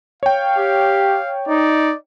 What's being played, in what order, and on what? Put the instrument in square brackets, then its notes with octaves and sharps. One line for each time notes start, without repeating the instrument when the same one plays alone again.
[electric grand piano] C#5 G5 [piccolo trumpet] F5
[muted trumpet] G4
[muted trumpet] D#4 [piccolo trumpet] D5